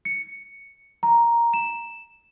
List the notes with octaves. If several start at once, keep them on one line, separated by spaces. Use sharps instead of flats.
C#7
A#5
E7